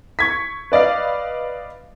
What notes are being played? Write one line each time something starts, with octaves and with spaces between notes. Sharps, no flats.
C#6 G#6 B6
B4 D5 D#5 F5